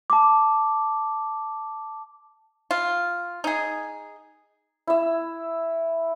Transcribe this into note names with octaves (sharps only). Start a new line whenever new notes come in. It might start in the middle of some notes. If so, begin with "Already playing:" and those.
A5 D6
F4
D#4 G#4
E4 E5